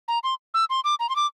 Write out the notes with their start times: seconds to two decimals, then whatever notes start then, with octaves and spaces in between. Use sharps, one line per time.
0.08 A#5
0.24 C6
0.54 E6
0.70 C6
0.84 D6
1.00 A#5
1.09 C6
1.16 D6